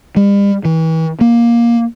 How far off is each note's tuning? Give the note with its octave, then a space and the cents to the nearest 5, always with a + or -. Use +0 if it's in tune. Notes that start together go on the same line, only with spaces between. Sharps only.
G3 +40
E3 -35
A#3 +10